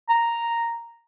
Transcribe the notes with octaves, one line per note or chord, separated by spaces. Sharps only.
A#5